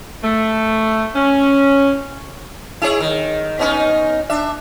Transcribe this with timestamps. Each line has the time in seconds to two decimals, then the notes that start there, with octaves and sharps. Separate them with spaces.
0.23 A3
1.16 C#4
2.82 E4 G#4 C#5
3.00 D#3
3.59 B3 C#4 D#4
4.30 D4 E5